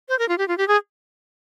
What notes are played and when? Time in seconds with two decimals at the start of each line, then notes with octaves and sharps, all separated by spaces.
0.09 C5
0.19 A#4
0.29 F4
0.38 G4
0.48 F4
0.58 G4
0.68 G#4